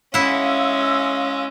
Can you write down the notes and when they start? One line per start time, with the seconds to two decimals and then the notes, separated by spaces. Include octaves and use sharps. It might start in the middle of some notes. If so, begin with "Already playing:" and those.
0.14 G#3 C#4 E4 F5 F#5 E6